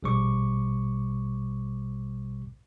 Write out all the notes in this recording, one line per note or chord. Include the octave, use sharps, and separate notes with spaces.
A#1 B2 G3 C5 C#6 D6